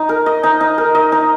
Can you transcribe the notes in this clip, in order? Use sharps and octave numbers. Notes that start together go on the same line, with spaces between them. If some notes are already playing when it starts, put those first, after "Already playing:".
Already playing: D#4
A#4
D#5
D#4
D#4
A#4
D#5
D#4